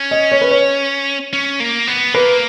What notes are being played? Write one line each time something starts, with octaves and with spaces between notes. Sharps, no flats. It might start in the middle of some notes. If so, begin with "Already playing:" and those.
Already playing: C#4
D#5
C#5
B4
C#5
C#4
A#3
B3
A#3 B4